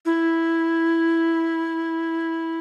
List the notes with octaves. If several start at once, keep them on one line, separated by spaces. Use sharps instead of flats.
E4